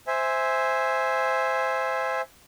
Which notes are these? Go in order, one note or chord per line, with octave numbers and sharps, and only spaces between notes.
C5 E5 G#5